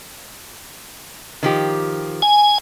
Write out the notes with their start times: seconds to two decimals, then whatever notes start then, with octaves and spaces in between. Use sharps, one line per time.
1.43 D#3 F3 G4
2.22 G#5